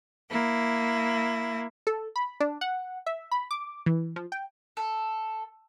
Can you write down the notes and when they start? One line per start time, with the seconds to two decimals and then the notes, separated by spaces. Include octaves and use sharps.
0.30 A#3 E4
1.87 A4
2.16 B5
2.40 D4
2.61 F#5
3.06 E5
3.31 B5
3.51 D6
3.86 E3
4.16 F3
4.32 G5
4.77 A4